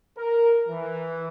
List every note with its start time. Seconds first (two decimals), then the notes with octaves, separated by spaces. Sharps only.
0.16 A#4
0.68 E3